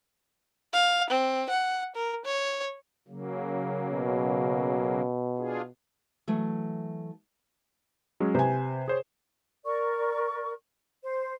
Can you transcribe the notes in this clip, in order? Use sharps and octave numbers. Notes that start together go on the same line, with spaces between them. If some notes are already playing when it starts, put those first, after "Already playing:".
F5
C4
F#5
A#4
C#5
C#3 F#3 A#3
B2
D4 F4 G#4
E3 F#3 A3
F#3 G#3 C#4
C3 B4 C5 G#5
G#4 C5 C#5
A#4 D5 C#6
C5